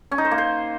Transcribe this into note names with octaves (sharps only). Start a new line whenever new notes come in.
C#4
D#4
C5
A#3
C5